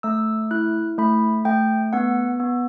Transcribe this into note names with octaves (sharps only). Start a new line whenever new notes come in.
A3 E6
E4 F#6
A3 B5
A3 G5
B3 F#5
B3